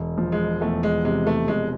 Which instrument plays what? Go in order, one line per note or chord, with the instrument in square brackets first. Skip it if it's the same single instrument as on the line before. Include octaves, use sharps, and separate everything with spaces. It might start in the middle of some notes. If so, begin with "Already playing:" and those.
Already playing: [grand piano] E1
F3
[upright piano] G#3
[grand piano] E2 [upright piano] A3
[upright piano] G#3
[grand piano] C3 [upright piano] G#3
[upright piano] A3
[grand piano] E1 [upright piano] G#3